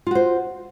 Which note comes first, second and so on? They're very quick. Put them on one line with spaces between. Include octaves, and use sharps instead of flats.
F4 F#4 C5